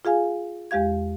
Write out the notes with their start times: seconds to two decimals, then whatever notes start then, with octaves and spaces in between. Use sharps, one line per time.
0.05 F4 G#4 F5 G#5
0.71 E2 G#3 G4 F5 G#6